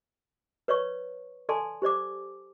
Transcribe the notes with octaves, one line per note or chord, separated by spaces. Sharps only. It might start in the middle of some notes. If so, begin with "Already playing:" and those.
B4 C#5 D5 C#6
A4 D5 G#5 A5 C6
G4 C5 D5 D6